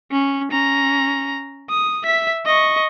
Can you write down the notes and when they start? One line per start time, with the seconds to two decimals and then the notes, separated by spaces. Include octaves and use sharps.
0.12 C#4
0.52 C#4 A#5
1.70 D#6
2.04 E5 B6
2.46 D#5 C#6